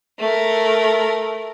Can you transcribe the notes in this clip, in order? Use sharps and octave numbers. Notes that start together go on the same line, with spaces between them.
A3 A#4